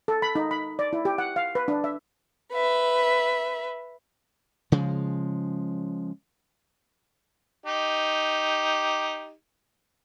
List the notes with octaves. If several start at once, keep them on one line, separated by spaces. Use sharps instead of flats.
A4
B5
D#4
B5
D5
E4
G4
F#5
F5
B4
D4
E5
B4 E5
C#3 F3 G#3
D#4 G4